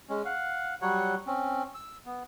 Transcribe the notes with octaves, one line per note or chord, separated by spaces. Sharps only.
G#3 C#4
F5 F#5
F#3 G3 C#5 F#5
C4 C#4
E6
B3